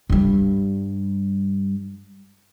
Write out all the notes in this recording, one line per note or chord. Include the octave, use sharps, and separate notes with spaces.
G2 G3